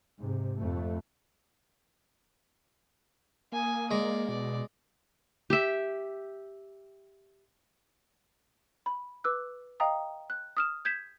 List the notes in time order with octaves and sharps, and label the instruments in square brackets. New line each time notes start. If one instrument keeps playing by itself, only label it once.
[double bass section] G#2 C3
F2 A3
[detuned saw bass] A#3 [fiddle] G#5 D#6
[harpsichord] G#3 A#5 [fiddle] D5
[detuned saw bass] B2 [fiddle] D5
[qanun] G4 E5
[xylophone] B5
B4 D6 E6 F#6
D#5 F5 G5 A#5 D#6
F#6
D#6 F6 E7
G6 G#6 B6 E7